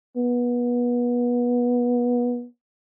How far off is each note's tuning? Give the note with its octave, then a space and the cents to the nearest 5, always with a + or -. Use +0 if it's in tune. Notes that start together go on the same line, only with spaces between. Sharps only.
B3 -25